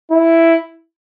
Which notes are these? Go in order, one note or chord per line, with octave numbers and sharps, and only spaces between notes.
E4